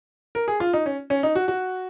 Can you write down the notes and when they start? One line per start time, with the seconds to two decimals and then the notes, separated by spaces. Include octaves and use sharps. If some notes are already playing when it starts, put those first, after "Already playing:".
0.35 A#4
0.48 G#4
0.60 F4
0.73 D#4
0.86 C#4
1.10 C#4
1.23 D#4
1.35 F#4
1.48 F#4